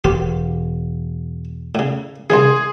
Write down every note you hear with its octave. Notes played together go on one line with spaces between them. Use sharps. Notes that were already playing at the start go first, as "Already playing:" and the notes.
E1 G4
A2 C#3
C2 C#3 E3 G#4 C6